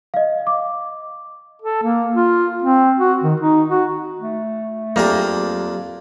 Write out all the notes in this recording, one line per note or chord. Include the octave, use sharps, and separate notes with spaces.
D#5 F5
D6
A4
A#3
F4
C4
F#4
D#3
D#4
F#4
A3
F2 F#3 A#3 D4 G4 G#4